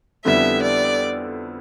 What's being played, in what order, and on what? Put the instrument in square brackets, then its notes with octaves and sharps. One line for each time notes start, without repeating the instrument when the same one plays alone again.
[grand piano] F2 D3 G3 B3 E4 [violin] E5
[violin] D5